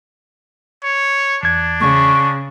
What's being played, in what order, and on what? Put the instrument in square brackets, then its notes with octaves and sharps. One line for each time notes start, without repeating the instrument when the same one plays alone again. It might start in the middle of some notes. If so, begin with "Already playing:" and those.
[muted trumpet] C#5
[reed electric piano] E2 G#6 [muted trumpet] D4
[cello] C#3 [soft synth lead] C#6